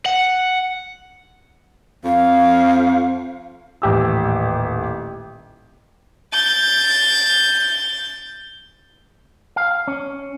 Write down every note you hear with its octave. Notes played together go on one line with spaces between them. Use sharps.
F#5
F2 F5
D#1 A1 G4 E6
G6 A6
F5
C#4